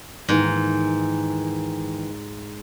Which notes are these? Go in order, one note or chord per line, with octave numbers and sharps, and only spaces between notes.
G#2 D#3 E3 A#3